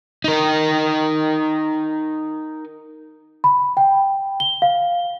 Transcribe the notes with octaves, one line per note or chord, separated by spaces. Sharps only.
D#4 A#4
B5
G5
G7
F5